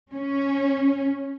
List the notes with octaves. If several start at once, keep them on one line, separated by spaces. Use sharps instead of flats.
C#4